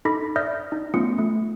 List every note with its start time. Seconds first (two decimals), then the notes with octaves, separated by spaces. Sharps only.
0.05 D#4 A4 B5 D6 A#6 B6
0.36 D5 E5 D#6 F6 G6 A#6
0.72 D#4
0.94 A3 B3 C#4 F4 D#6 C#7
1.18 A3